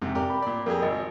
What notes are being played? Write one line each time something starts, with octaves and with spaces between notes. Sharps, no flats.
F2 G#2 C3 C4
G4 A#4 D5
B5
A#2 D5
F2 G4 G#4 A#4
G#1 D#5